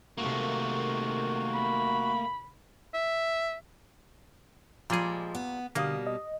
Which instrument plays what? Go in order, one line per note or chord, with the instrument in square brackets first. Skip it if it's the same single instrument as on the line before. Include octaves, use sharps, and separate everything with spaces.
[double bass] C3 D#3 [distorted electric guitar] A3 A#3 [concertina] F#4
[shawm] B5
E5
[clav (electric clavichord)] A#2 G3 G#4 [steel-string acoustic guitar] F3 G#3
[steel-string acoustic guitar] B3
[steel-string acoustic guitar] B2 G3 [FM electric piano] D3 F5 D#6 [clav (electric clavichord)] A#3
[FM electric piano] D#5